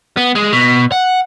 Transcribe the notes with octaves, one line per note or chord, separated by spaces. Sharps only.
B3
G#3
B2
F#5